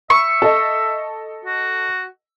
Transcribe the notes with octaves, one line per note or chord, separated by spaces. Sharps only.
E5 C#6
A4 D#5
F#4